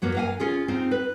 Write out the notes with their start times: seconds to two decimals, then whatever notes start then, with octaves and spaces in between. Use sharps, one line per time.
0.02 F#2 F#3 A#3 B3
0.15 A#4 F5 G#5
0.40 C#4 F4 G#4
0.68 C4 D#4 F4
0.91 B4